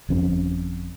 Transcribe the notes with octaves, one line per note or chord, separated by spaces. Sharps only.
G1 F2 C#4